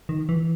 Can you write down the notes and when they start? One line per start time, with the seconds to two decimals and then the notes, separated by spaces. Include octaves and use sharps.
0.09 D#3
0.29 E3